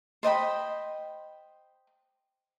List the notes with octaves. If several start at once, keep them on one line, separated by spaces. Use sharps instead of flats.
C5 D#5 G5 B5